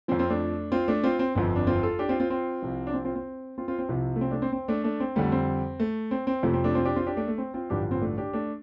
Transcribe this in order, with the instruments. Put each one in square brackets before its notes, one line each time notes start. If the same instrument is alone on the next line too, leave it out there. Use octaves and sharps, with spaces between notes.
[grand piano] F3 C4
F2
C4 F4
A3 D4
C4 F4
A3 D4
C4 F4
C4
G1 F2 F3 C4
D4
C4 F4
F4 A4
D4 G4
C4 F4
C4 F4
C4 F4
C2 C3 F3
D4
C4
C4 F4
C4
C4 F4
C4 F4
C4
C2 C3 F3
A3
C4
A3 D4
C4
C4
A3 D4
A3 D4
C4
F2 D3 G3 A3
C4
A3
C4
C4
F2 C3 F3 A3
C4
A3 D4
C4 F4
D4 G4
C4 F4
D4 G4
A3 D4
A3
C4
C4 F4
A1 G2 D3 F3 D4 G4
C4 F4
A3 D4
D4 G4
A3 D4